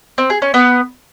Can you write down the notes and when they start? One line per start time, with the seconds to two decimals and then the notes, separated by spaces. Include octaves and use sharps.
0.18 C4
0.30 G#4
0.42 C#4
0.54 B3